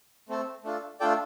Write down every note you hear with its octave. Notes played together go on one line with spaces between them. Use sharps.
A3 C4 A4
A3 D4 F4 A4
A3 D4 F4 A4 D5 G5